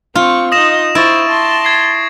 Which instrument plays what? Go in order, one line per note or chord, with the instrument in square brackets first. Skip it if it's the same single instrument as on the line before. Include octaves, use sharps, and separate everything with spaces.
[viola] C4 C#6 [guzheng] F4
[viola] D#4 D#5 [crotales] D#6 A#6 E7
[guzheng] E4 [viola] C5 [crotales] C#6 A6 D7
[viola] A5 C6
[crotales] G#6 C7